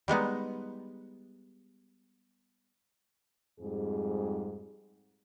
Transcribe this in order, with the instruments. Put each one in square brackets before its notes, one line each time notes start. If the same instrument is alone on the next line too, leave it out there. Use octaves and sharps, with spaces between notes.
[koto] G3 G#3 B3 D#4
[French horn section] F2 G#2 G3 G#4